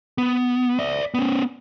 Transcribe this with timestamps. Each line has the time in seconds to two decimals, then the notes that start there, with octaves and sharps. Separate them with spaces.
0.18 B3
0.79 D5 E5
1.14 B3 C#4